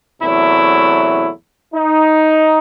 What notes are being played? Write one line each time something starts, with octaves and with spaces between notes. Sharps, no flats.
E2 C3 F#3 A3 E4
D#4